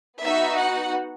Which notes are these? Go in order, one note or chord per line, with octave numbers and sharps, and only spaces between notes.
B3 D#4 F#4 E5
F#5